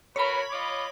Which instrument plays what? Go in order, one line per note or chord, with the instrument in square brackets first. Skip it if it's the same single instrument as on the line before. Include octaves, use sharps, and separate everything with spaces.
[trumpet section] F#4 A#4 B4 [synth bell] C#5 B5
[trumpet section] F4 D#5 D6